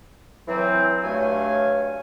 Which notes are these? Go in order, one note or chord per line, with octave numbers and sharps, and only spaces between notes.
E3 F#3 C4
G2 F#3 A3 C#5 F5 G#5